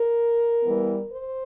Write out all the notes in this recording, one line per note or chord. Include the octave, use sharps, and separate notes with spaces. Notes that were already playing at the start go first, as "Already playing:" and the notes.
Already playing: A#4
E3 G3 B3
C5